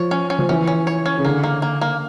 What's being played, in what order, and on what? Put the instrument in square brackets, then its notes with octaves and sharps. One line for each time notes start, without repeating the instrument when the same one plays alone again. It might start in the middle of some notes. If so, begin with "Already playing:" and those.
Already playing: [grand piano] F3 [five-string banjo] C#5
[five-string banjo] C#4
C#4
[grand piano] F3
[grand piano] E3 [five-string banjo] C#4
[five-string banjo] C#4
C#5
C#4
[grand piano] C#3
[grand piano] D3 [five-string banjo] A#3
[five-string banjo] A#3
A#3
A#3